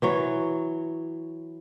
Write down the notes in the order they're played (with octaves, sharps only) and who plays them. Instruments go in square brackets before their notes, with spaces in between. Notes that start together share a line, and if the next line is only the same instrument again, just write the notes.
[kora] E3 F#3 C#5